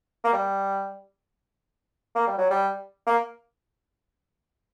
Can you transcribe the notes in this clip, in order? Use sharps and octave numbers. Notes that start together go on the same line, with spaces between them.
A#3
G3
A#3
G3
F#3
G3
A#3